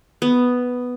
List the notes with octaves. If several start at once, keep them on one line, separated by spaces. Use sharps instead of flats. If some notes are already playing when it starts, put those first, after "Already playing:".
B3